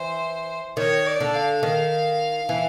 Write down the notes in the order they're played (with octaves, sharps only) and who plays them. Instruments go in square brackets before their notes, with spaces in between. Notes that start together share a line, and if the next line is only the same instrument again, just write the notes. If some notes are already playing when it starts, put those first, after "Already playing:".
Already playing: [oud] E3 [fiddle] C5
[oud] D#3 [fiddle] C#5
[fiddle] D5
[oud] D3
[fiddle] F5
[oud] D#3 [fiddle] F5
[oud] E3